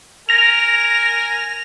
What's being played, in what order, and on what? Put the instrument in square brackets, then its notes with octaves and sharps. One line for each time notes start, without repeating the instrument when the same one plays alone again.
[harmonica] A#4 G#5 [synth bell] A#6 F7